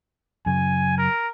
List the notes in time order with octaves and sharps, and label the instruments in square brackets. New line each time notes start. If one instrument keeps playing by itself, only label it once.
[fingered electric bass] F#2 C#3 [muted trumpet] G#5
[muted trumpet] A#4